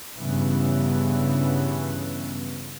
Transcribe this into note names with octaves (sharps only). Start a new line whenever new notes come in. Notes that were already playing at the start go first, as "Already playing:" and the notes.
G2 C#3 E3 B3